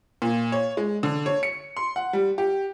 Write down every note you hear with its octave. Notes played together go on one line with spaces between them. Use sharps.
A#2
C#5
G#3
D3
C#5
C#7
C6
F#5
G3
G4